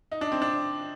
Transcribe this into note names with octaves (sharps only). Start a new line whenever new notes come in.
D#4
D4
C4
D4